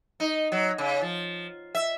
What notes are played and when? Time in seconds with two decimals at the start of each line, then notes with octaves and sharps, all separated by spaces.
0.20 D#4
0.52 F#3
0.78 C#3
1.01 F3
1.75 E5